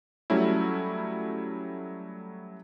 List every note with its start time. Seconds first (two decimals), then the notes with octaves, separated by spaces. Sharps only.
0.30 F#3 G3 A3 C#4 E4